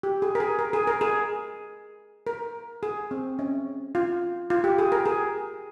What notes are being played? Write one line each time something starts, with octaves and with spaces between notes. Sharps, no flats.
G4
G#4
A#4
G#4
A#4
G#4
A#4
G#4
A#4
G#4
C4
C#4
F4
F4
G4
G#4
A#4
G#4